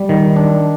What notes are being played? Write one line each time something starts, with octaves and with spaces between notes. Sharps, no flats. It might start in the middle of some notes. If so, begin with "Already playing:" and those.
Already playing: G3
D#3
D4